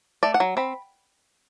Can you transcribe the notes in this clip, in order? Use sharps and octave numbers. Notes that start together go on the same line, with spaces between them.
A3 D5
F#5
F#3
C4 B5